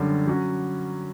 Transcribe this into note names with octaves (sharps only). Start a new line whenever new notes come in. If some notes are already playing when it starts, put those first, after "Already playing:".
Already playing: F#2 D3 G3 C#4
F#3 C#4 F#4